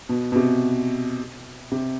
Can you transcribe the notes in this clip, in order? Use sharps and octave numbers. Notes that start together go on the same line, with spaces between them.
B2
B2
C3
C3